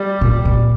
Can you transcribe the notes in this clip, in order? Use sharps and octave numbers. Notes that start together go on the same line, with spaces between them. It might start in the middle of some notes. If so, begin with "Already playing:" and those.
Already playing: G3
A#2
A#2